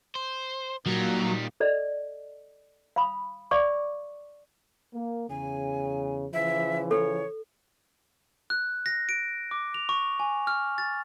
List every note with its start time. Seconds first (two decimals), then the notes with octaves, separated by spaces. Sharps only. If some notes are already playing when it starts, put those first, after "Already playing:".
0.15 C5
0.86 A#2 D#3 F#3 G3
1.60 A4 D5 D#5
2.96 F5 B5 D#6
3.51 D5 F5 C#6 D6
4.94 A#3
5.30 E2 C#3 G#5
6.33 C#3 E3 F3 E5
6.91 A4 C#5
8.50 F#6
8.86 A#6
9.09 D7
9.51 D6
9.74 F7
9.89 C#6
10.20 G#5
10.47 F6
10.78 A6